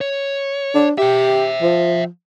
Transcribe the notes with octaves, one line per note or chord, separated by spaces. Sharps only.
C#5
D4
G4 E5 G5
F3